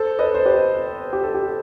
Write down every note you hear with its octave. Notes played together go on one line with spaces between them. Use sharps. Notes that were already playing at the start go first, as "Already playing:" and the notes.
Already playing: A4 C5
B4 D#5
C5
G4 B4
G4
A4
G4